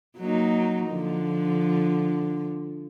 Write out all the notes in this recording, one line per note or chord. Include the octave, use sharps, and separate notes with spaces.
F#3 A#3 D#4
D3 F3